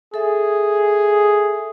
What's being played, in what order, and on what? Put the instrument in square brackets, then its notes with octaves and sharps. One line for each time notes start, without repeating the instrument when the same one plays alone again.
[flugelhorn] G#4 [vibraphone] A4 E5